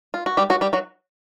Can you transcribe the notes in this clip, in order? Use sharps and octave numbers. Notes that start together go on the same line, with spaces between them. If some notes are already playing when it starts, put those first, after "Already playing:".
F4
F#4
G3 G4
F#3 F#4
G3 G4
F#3 F#4